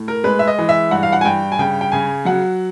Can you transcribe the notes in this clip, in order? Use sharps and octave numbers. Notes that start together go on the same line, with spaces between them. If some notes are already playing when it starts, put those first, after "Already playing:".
Already playing: A2
A#4
G#3 B4
E5
D#5
E3
E5
G2 F#5
F5
F#5
G#5
G2 G5
G#5
C#3 G5
G5
C#3 G#5
F#3 F#5